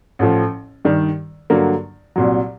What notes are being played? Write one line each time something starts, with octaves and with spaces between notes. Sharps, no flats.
A1 A2 F3
G2 D#3 G3
G2 D3 F#3 A#3
C2 A#2 F#3